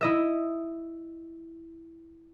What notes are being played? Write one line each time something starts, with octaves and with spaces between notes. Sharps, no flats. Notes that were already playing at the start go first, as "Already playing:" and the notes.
E4 D#5 E5